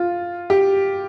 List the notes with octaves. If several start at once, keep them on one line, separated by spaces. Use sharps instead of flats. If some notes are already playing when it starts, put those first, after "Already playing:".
Already playing: F4
G4